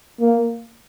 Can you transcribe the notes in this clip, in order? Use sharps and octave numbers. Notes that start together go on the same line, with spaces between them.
A#3